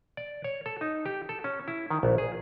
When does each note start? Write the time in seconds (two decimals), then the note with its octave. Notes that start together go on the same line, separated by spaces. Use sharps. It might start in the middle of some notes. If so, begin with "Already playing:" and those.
0.17 D5
0.44 C#5
0.66 A4
0.81 D#4
1.06 G4
1.29 A4
1.44 C#4
1.68 E4
1.90 D#3
2.03 A#1
2.18 G#4